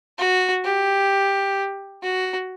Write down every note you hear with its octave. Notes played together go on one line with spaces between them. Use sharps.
F#4
G4
F#4